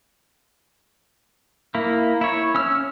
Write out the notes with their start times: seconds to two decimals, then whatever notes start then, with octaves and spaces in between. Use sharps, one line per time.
1.75 A#3 E4
2.21 E4 C#5
2.55 C#4 E6 F6